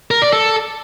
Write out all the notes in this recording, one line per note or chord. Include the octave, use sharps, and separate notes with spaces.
A#4
D5
A4